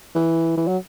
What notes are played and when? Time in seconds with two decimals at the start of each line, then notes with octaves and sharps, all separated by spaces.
0.15 E3
0.57 E3
0.68 F#3